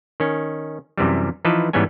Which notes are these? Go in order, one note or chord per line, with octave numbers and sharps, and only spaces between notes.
D#3 C#4
F#2 C3 E3 G3
E3 F3 D#4 B4 A5
G#2 E3 G3 B3 C#4 G#5